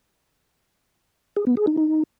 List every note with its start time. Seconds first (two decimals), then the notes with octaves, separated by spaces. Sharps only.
1.37 G#4
1.47 B3
1.57 G#4
1.67 D#4
1.77 D#4